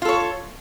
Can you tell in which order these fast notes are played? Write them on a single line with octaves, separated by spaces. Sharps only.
F4 A4 C#5